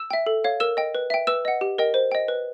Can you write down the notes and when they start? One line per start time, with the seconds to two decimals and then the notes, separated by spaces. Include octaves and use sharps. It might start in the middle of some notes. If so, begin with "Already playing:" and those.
Already playing: E6 E7
0.11 E5 G5
0.27 A4
0.44 C#5 F5
0.60 A#4 E6 E7
0.77 D#5 G5
0.95 B4
1.10 E5 G5
1.27 B4 E6 E7
1.45 D#5 F#5
1.61 G4
1.78 A#4 D#5 G5
1.94 C5
2.12 D#5 G5
2.28 B4